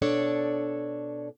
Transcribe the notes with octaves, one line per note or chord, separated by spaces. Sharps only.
B2 D4 A4 C#5 D5